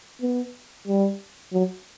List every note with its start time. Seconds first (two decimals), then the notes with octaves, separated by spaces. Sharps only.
0.22 B3
0.88 G3
1.53 F#3